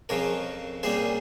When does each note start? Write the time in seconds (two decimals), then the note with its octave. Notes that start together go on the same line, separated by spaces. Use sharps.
0.09 F2 C#3 F3 A#4 C#5
0.83 A#2 G3 C#4 G#4 C5